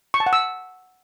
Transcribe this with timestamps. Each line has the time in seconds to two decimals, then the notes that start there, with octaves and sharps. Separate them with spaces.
0.14 C#6
0.20 A5
0.26 F#5
0.33 E6